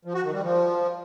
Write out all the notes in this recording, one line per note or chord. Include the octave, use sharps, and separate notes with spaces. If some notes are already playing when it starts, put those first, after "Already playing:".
F3
F#4
D#3
G3
F3